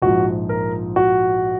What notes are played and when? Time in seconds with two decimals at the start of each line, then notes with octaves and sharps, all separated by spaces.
0.02 A#1 G#2 F3 F#4
0.49 A#4
0.96 F#4